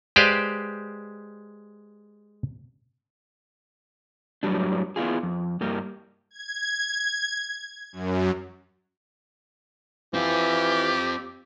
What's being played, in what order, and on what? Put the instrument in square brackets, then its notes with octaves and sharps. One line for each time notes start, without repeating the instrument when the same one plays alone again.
[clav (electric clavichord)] G#3 G4 B4 C5 D5 F5
[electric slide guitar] F#2 A2 C3 F#3 G3 D4
B3 E4 F4 G#4
F2
G2 A#3 G4
[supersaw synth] G#6
F#2
[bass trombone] E3 [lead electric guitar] C4 F4 [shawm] G4